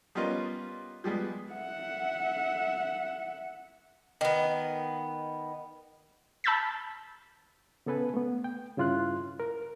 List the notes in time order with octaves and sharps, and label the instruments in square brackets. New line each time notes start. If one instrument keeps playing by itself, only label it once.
[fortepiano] G3 B3 C#4 F4 A#4 D#5
F3 G3 G#3 B3
[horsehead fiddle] E5 F#5
[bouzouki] D#3 B3
[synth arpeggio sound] A5 B5 E6 G6 A6 B6
[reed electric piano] C#3 B3 A4 B4 G#5
A3 B3
G5
G2 C#3 E4 F4 C6 F#6
A#4